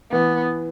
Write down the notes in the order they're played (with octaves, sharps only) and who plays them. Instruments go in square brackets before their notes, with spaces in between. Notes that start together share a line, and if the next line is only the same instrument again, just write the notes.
[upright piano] E3 [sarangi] B3